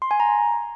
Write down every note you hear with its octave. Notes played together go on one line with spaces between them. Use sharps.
C6
G#5
A#5